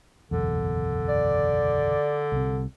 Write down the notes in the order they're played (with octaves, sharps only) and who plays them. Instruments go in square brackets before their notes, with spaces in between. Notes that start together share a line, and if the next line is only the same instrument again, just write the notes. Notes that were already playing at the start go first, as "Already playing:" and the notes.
[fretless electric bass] F#1 B1 E2 [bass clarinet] D3
[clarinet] D5
[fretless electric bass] C2 C3